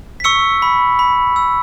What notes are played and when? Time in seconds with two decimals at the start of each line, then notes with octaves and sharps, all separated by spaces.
0.20 B6
0.24 C#6 E6 C#7
0.62 B5
0.99 B5
1.36 E6